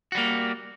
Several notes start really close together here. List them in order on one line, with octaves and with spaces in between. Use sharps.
F#4 G3 A#3